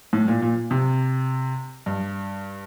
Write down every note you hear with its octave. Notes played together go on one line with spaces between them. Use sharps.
A2
A#2
A#2
C3
G2